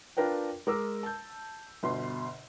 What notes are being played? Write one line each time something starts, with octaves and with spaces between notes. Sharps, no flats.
D4 F4 A#4 B4 G5
G#3 A#4 D6 E6
A5 G6
G1 B2 C6